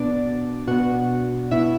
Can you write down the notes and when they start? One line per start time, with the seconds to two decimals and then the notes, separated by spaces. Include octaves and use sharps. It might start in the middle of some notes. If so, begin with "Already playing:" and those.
Already playing: B2 B3 D4 D5
0.67 B2 B3 F#4 F#5
1.51 B2 B3 E4 E5